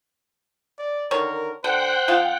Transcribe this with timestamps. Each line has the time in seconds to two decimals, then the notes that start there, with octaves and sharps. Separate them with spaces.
0.79 D5
1.11 D3 D#3 A#4 C#5
1.64 D3 C5 F#5 G5
2.08 F3 C4 F4